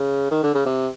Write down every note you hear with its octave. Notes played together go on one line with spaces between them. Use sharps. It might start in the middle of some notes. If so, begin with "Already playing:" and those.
Already playing: C#3
D#3
D3
C#3
C3